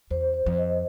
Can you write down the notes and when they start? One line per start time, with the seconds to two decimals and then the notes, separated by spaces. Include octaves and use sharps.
0.11 E2 C5
0.34 C5
0.47 F2
0.58 D#5